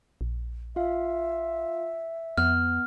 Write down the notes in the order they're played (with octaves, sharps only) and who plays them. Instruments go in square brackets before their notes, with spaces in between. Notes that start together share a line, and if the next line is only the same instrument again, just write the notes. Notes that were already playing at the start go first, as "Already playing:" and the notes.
[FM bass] A#1
[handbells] F4 F5 [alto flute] E5
[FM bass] F2 [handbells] B3 [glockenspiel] F6